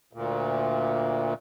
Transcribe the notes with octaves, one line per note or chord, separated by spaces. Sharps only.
D2 A#2